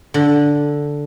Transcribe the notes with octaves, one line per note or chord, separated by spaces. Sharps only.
D3